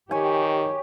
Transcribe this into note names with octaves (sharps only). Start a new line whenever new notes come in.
D#3 G4 C#5 G#5